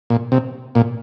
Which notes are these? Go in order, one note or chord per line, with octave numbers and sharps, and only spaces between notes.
A#2
C3
A#2